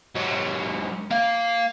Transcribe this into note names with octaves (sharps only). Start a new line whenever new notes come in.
G#2 F#3
A#3 F5